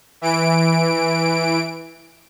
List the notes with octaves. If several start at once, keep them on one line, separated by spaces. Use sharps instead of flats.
E3 D7